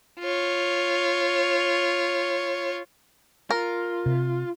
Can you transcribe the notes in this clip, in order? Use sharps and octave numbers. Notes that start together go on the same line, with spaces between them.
F4 C#5
F4 A#4
C3